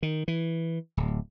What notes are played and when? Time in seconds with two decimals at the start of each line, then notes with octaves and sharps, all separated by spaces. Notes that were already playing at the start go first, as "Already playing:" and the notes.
0.03 D#3
0.28 E3
0.97 D1